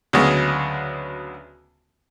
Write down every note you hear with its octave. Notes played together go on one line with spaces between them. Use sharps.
D2 C#3 F#3 G#3 B3